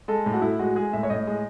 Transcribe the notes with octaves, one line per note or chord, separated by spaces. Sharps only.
G#3 A4
A2
F#4
A2 E4
G#3 F#4
G#3 G#4
A2 E5
C#5
A2 D#5
G#3